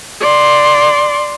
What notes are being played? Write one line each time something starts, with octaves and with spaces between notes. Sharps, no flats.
D5 C6